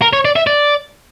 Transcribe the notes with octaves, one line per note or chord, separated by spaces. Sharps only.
A#4
C#5
D5
E5
D5